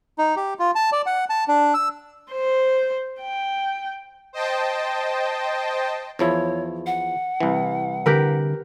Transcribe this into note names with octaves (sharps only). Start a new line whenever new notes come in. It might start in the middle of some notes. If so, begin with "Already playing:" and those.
D#4
G4
F4
A5
D5
F#5
A5
D4
E6
C5
G5
C5 D#5 G5 A5
E2 F3 E4 C#5
F#5
C2 E3
D3 G4 A#4 B4